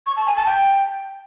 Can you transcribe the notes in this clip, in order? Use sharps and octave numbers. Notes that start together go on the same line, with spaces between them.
C#6
A5
G#5
A5
G5